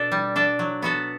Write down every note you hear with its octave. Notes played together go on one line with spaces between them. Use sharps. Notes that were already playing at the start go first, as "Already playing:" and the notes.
Already playing: B2 D4 A4
G3
D4 A4
F#3
B3 F#4 A4